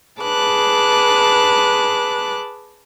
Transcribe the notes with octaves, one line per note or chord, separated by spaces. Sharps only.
G#4 B4 A5 D6 F#6